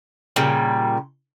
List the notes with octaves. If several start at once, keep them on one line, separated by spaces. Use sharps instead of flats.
A#2 C#3 G3